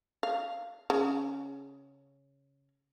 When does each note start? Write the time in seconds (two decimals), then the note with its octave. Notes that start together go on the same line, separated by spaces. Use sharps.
0.23 F5
0.90 C#3